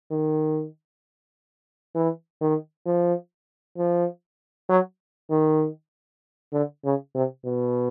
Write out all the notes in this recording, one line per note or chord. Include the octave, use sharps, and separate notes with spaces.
D#3
E3
D#3
F3
F3
F#3
D#3
D3
C#3
C3
B2